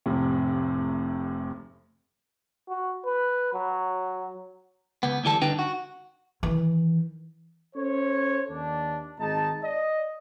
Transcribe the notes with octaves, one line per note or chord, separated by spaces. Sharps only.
F1 A2 C3
F#4
B4
F#3
C#2 B3
D2 E3 G3 A4
G2 D3 D4 D#4 B4 G5
F#4
D#3 E3
C#4 A4 C5 C#5
D#2 D4
G#1 G#3 D#4 A5
D5 D#5